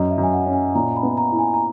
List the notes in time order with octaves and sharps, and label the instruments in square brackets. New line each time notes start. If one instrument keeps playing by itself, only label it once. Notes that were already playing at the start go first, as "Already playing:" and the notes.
Already playing: [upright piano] F#2 [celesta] D#5
[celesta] E5
[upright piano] F#2
[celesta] G#5
F#5
[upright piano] C#4
[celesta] G#5
[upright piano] A#2 [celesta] A#5
[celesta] B5
[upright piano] B3
[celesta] A#5
[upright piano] E4
[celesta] G#5
A#5